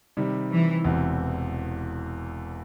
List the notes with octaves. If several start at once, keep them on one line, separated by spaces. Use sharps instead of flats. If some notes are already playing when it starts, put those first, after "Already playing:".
C3 D#3 G3
E3
E1 E2 C3